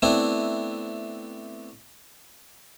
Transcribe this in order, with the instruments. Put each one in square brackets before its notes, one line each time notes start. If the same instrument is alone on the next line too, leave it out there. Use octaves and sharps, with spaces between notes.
[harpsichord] A3 B3 C4 D4 E4